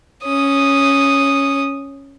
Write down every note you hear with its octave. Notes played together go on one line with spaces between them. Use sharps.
C#4 D#6